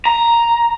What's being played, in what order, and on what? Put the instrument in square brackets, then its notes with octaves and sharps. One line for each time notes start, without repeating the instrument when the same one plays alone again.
[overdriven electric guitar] A#5